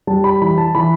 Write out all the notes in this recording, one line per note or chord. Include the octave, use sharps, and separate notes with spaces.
G3 A5
B5
E3 B5
A5
E3 B5